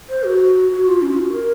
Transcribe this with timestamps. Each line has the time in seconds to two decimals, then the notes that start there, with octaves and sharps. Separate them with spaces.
0.09 C5
0.25 F#4
0.72 F#4
0.87 F4
1.02 C#4
1.12 F4
1.22 F#4
1.32 A#4